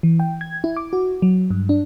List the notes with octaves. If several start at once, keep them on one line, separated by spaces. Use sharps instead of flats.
E3
G5
G#6
E4
D6
F#4
F#3
G2
D4